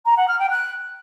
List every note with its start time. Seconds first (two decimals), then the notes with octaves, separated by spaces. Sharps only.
0.05 A#5
0.16 F#5
0.28 F6
0.39 G5
0.50 F#6